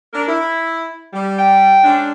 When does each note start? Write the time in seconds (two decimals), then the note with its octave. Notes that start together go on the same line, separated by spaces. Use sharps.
0.13 D4 A#4
0.27 E4
1.14 G3
1.38 G5
1.84 G#3 C#4 D4